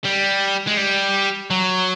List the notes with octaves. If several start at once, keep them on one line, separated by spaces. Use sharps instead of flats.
G3
G#3
G3
F#3